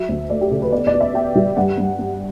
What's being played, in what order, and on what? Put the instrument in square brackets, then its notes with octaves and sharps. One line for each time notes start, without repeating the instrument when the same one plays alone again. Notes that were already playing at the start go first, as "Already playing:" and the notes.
Already playing: [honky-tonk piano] F#3 E5
D2
A3 D5
G4
C#3 A4
B4
B3 D5
D5
B3
E5
B3 G5
G3
G2 F#5
G2
G2